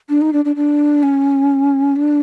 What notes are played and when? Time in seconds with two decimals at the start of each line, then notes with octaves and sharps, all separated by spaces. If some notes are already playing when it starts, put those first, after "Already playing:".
0.09 D4
0.21 D#4
0.33 D4
0.45 D4
0.56 D4
1.03 C#4
1.96 D4